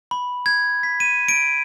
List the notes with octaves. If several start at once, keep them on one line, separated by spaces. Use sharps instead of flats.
B5
G#6
B6
D#7
D7